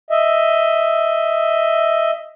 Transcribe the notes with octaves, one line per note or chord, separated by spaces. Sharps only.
D#5 E5